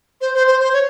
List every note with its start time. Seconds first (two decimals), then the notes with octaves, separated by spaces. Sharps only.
0.21 C5
0.34 C5
0.47 C5
0.60 C5
0.73 C#5